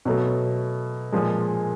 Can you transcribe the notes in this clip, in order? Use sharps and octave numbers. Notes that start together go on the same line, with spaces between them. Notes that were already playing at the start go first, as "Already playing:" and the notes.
B2 F#3 A3
A#2 F3 G#3